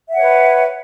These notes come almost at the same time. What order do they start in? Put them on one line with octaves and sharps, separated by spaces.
E5 F#5 C#5 B4